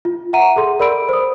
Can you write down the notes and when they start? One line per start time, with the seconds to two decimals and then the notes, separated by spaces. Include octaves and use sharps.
0.05 F4
0.33 E5 F#5 A#5 D#7
0.56 G#4 A4 C6
0.80 A#4 D5 B5 E6 D7
1.09 C5 D#6